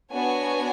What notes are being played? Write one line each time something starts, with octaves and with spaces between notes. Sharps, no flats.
B3 D4 F#4 C#5 G#5